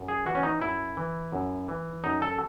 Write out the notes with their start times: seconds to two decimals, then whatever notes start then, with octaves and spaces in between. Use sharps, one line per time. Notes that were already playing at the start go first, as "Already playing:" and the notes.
Already playing: F#2
0.08 G#4
0.26 E3 F#4
0.35 C#4
0.43 D#4
0.61 F#2 E4
0.97 E3
1.32 F#2
1.68 E3
2.04 F#2 D#4
2.22 A4